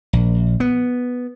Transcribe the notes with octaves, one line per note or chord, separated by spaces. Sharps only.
A#1
B3